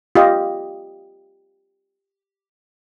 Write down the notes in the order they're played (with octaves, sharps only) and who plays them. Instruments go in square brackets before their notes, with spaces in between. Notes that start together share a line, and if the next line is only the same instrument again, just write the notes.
[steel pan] F4 G4 D#5